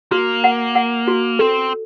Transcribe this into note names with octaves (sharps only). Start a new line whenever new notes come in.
A#3 F#4
F#5
F#5
F#4
C4 A4